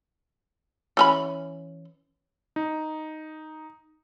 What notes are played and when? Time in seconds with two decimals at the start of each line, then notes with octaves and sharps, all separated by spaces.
0.97 E3 C#4 B5
2.56 D#4